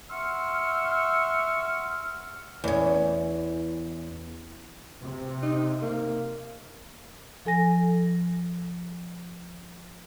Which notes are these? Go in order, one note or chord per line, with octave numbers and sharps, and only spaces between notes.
E5 F#5 C6 C#6 E6 F6
E2 C#4
C3
D#4
A#3
F3 A4 G#5 A#6